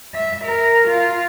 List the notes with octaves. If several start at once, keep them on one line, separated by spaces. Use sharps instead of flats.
E5
A#4
F4